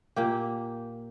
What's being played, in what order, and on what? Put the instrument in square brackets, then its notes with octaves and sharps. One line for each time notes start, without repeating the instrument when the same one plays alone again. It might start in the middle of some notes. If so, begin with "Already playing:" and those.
[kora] A#2 A#3 G4